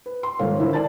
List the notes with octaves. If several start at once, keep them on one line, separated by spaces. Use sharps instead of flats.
B4
C6
D#1 G#2 A4 C#5 F5
D3 E4 A#4 C5
C5 D5 G#5 A5 A6